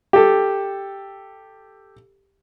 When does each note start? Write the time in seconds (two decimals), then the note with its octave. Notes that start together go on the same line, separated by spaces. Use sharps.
0.13 G4 A4